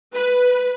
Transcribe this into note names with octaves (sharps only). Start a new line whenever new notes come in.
B4